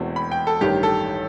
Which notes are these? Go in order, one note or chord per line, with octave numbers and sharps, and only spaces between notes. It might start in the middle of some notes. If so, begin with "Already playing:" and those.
Already playing: E1 E2 B2 A3 C4
B5
G5
A4
A1 G2 D#3 G4
A4